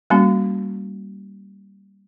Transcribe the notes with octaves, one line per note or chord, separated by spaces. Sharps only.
G3 A#3 C#4 F#4